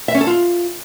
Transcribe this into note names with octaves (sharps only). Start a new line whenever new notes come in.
E5
C#4
A4
F4